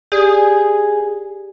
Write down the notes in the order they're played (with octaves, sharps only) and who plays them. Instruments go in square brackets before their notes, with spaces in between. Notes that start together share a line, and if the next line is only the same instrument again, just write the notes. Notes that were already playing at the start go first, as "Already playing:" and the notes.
[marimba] G4 D5 D#6 [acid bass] G#4